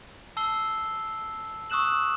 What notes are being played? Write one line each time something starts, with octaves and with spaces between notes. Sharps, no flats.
A5 E6 C7 G7
C#6 D#6 E6 F#6 E7 F#7